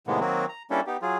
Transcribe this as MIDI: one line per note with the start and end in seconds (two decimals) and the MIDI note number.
0.07 0.20 45
0.07 0.20 48
0.07 0.20 51
0.07 0.20 56
0.07 0.20 58
0.07 0.20 59
0.20 0.46 51
0.20 0.46 54
0.20 0.46 58
0.20 0.46 60
0.20 0.46 66
0.49 0.63 82
0.70 0.81 55
0.70 0.81 58
0.70 0.81 61
0.70 0.81 62
0.70 0.81 64
0.70 0.81 69
0.87 0.97 59
0.87 0.97 63
0.87 0.97 67
1.02 1.18 54
1.02 1.18 65
1.02 1.18 68